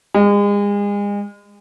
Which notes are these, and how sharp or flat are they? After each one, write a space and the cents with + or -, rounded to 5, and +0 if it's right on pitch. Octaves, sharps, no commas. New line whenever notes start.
G#3 -35